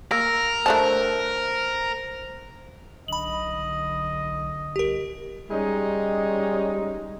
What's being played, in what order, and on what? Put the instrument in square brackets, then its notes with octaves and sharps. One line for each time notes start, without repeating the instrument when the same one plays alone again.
[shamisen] A#3 [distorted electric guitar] A#4 [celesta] E6 A#6
[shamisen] A3 D4 A5 [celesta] C5 F#6
[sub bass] B1 [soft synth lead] D3 [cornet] D#5 [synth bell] B5 F#7
[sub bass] C2 [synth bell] G4 A#4
[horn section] G3 G#3 C#4 D#4